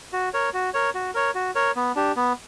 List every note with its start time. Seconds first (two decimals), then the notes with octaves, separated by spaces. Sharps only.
0.13 F#4
0.33 A#4 C#5
0.54 F#4
0.74 A#4 C#5
0.95 F#4
1.14 A#4 C#5
1.35 F#4
1.55 A#4 C#5
1.76 B3
1.96 D4 G4
2.16 B3